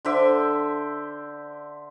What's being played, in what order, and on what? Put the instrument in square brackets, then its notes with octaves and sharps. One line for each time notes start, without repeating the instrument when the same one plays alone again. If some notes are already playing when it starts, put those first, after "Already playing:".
[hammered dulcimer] D3 C5 E5 D6